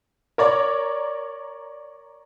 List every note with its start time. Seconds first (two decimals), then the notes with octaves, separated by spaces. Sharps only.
0.38 A#4 C#5 D5